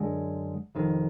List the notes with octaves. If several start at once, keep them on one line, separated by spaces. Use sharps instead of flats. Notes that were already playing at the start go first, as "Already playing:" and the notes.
Already playing: F#2 D3 G#3
F1 F2 D#3